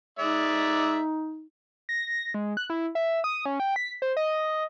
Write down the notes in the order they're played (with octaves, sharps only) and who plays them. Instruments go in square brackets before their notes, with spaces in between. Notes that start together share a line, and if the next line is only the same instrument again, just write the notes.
[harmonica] G#3 D5 E5 [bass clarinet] D#4
[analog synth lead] A#6
G#3
F#6
E4
E5
D#6
C#4
G5
B6
C5
D#5